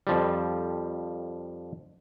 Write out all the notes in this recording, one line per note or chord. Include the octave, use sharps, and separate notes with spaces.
F2 F3 G3